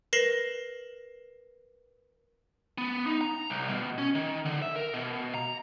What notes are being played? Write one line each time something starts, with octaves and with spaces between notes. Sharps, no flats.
A#4 B4 A#6 C7 E7 F#7
B3
D#4
A#5
C2
B2
C#4
D#3
D3
E5
A#4
B2
A#5